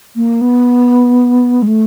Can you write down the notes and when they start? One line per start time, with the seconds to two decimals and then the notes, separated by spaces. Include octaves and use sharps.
0.16 A#3
0.41 B3
1.62 G#3
1.67 A3